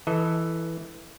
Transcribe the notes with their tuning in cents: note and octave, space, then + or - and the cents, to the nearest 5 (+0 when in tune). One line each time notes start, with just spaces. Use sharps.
E3 +0 A4 +0 D#5 +35